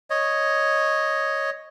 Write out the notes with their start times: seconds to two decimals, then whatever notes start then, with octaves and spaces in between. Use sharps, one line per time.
0.10 C#5 D#5